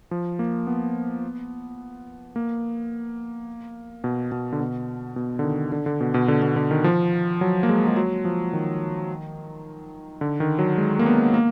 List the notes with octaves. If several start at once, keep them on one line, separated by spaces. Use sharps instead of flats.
F3
A#3
B3
A#3
B2
B2
D3
B2
B2
D3
D#3
D3
D3
B2
B2
D3
B2
D3
D#3
F3
F#3
A#3
G#3
G#3
F#3
F3
D#3
D3
D#3
F#3
G#3
A#3
B3
A#3